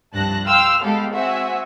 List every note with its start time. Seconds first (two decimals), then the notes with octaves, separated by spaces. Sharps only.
0.13 C2 G2 F3 A5 F#6 A#6
0.46 F5 G5 C6 E6 F6
0.83 G#3 B3 G4 A4 F5
1.13 C4 F#4 E5 F#5 G#5